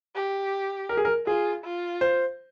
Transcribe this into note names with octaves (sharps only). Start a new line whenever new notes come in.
G4
A#4
G#4
A#4
F4 G#4
F4
C5